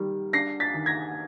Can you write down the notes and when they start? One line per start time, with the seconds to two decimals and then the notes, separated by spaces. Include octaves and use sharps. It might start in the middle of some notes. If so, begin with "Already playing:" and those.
Already playing: D#3 G3
0.33 D4 A#6 C7
0.60 A6 B6
0.74 D#3
0.86 G#6 A#6